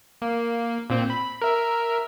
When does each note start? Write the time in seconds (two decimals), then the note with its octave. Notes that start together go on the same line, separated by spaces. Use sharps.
0.22 A#3
0.90 A#2 C4
1.10 B5
1.42 A#4 E5